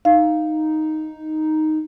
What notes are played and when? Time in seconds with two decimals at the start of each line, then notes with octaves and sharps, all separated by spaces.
0.05 D#4 F5